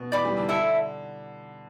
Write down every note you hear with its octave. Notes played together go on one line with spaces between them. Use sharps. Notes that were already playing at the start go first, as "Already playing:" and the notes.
Already playing: B2
E3 D5 B5 D6
G3
D3
D3 E4 A4 E5